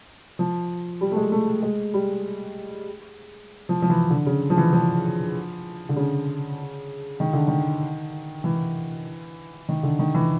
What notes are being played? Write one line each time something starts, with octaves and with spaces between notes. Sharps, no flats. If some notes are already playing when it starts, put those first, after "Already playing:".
F3
G3
A3
G#3
A3
G#3
G3
F3
F3
E3
D3
C#3
F3
E3
F3
D3
C#3
D#3
D3
D#3
E3
D#3
D3
D#3
E3